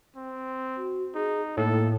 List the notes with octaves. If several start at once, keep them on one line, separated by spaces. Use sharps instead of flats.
C4
F#4
D#4 G#4
A2 A#3 A4